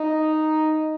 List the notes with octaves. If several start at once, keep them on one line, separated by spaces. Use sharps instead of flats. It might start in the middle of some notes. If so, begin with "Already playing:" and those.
Already playing: D#4